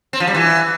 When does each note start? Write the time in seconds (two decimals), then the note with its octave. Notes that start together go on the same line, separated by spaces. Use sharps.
0.13 C4
0.20 F3
0.27 G3
0.35 E3